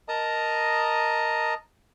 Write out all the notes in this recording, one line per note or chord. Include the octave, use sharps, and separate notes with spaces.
A#4 D#5 A5 A#5 D#6